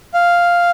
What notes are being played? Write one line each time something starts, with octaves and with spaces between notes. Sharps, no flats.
F5